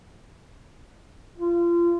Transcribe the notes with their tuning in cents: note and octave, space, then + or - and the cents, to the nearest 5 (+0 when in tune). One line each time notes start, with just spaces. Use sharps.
F4 -30